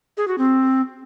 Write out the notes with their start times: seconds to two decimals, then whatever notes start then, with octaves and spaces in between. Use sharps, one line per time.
0.17 G#4
0.28 F#4
0.38 C4